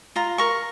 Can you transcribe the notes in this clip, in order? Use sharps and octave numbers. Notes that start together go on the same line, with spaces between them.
F4 A#5
A#4 C#6